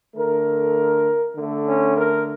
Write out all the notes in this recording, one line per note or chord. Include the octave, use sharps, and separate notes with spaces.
D3 A3 A#4
D3 A3
C#4
A#4